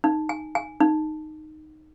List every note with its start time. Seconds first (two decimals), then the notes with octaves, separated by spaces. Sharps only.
0.04 D#4
0.29 G#5
0.55 G#5
0.80 D#4